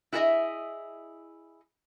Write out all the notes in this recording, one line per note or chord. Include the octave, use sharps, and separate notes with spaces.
E4 F#4 G#4 A4 D#5 E5